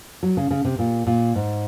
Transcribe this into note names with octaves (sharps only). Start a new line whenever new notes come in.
F#3
C#3
C#3
C3
A#2
A#2
G#2